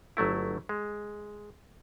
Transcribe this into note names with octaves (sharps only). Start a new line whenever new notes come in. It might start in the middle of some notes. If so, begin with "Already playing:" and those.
G1 F#3 A3 E4
G#3